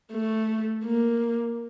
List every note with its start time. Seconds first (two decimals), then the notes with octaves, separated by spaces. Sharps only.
0.12 A3
0.85 A#3